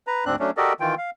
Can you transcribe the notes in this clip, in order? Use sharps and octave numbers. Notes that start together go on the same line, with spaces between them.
B4 A#5
D2 G#2 C4 D4 F#6
F#3 A3 C#4 D4
F#4 G4 A4 A#4 D5 D#5
D#3 E3 F4 G5
F5